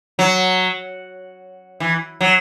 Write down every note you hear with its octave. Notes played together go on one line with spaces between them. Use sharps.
F#3
E3
F#3